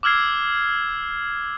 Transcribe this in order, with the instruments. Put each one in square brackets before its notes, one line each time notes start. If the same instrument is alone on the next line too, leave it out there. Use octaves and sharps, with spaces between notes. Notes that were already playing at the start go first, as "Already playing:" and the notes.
[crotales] D6 E6 F6 G#6 C7